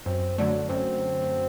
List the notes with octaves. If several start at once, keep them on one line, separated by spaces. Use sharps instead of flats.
F#2 C4
D3 F#3 A3 D4
F#2 C4